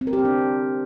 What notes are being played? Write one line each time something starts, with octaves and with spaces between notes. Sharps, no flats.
C4
A#4
G4
C4
D4